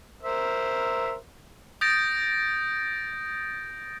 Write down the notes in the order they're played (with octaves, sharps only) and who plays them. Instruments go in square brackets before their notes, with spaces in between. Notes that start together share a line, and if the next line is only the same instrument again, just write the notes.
[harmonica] A#4 C5 E5
[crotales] D#6 G6 A6 A#6 D7